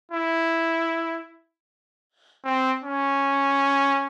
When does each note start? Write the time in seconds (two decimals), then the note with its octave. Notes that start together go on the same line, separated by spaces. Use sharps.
0.11 E4
2.45 C4
2.84 C#4